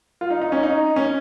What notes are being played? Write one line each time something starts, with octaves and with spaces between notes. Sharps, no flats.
F4
D#4
D#4
C#4
D#4
C#4